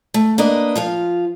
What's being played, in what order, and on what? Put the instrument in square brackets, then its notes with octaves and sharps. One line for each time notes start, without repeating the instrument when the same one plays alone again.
[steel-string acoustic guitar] A3
A#3 D4 B4 D#5
F3 F4 F5